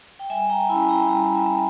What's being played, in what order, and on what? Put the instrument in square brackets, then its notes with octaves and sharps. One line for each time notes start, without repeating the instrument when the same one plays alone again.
[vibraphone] G5
G3 E5 G#5
G5 A#5
C#4 E4 G#5 B5
G5 A#5
G3 G5 A#5
E5 G#5
C#4 E4